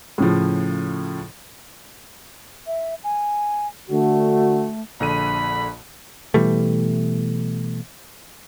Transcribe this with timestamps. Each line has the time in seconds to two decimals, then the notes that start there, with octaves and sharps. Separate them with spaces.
0.18 A2 C#3 F3
2.67 E5
3.04 G#5
3.90 D3 A3 F#4
5.00 A#1 D3 B5 D#7
6.34 B2 E3 G3 A3